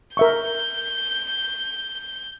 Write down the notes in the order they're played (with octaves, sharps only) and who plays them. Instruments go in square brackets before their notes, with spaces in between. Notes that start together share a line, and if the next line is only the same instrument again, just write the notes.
[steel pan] A#4 E5 C#6 [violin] G6